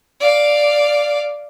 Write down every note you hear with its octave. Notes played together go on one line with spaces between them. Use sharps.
D5 F5